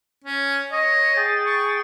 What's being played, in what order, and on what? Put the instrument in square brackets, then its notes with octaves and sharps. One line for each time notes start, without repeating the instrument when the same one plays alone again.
[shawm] C#4
[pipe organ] C#5 [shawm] D#5
[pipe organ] G#4 G5 A6
[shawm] C#6